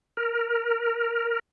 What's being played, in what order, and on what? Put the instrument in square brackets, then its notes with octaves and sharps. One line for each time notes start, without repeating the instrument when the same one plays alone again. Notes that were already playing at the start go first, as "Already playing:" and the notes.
[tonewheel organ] A#4